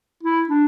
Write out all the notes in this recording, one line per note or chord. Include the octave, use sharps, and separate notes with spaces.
E4
D4